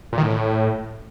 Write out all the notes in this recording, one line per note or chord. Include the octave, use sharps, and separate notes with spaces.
A#2
D#3
A2